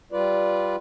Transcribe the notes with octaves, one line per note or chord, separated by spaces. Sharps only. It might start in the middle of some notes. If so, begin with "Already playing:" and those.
G3 F4 B4 D5